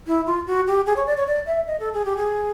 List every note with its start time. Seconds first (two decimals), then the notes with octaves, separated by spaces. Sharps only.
0.07 E4
0.26 F4
0.47 F#4
0.67 G4
0.86 G#4
0.96 C#5
1.07 D5
1.17 C#5
1.27 D5
1.46 E5
1.67 D#5
1.80 A4
1.94 G#4
2.05 G4
2.17 G#4